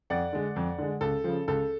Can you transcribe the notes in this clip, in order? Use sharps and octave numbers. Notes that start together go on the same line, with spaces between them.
F2 D5 F#5
D3 G#3
F2
D3 G#3
C#2 A4
C#3 F3
C#2 A4